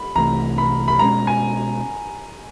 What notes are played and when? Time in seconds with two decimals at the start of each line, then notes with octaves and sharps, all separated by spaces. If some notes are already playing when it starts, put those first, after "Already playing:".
Already playing: B5
0.16 C2 C3 E3 A3 A#5
0.58 B5
0.88 B5
0.99 B2 G#3 C#4 A#5
1.27 G#5